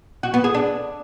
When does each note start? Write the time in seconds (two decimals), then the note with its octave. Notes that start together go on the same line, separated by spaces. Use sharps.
0.23 F#4
0.34 B3
0.44 G#4
0.54 D4